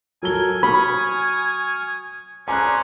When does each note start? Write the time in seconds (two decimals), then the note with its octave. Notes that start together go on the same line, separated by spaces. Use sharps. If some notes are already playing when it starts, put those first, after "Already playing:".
0.23 F#3 A4 A#4 G#5 G7
0.63 B5 C#6 D#6 F6
2.48 C#4 G#4 C5 D5 G#5 A#5 F#6